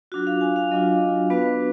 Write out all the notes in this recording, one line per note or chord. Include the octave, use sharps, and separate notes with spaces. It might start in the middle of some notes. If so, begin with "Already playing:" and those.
F#3 D4 F4 F#4
F5
G#5
F5
F#3 D4 F4 D#5
B3 D4 F#4 B4